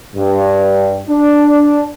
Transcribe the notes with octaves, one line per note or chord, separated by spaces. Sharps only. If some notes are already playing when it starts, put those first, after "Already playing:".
G2
D4